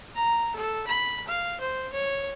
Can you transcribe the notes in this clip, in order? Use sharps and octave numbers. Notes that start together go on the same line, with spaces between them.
A#5
A4
B5
F5
C5
C#5